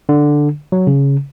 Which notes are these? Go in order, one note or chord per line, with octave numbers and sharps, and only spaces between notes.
D3
F#3
C#3